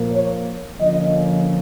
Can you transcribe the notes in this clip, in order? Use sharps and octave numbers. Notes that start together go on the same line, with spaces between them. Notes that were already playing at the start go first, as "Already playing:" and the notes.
Already playing: A#2 F3 A#3
C#5
D3 F3 A#3 C#4 F4 D#5